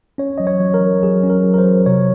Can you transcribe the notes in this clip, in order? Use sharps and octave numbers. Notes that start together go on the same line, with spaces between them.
C#4 C#5
F#3 D#5
C#5
F#3
A#4
F#3
F#3 G#4
C#4
A#4
F#3
A#4
C5
F#3
C3 C#5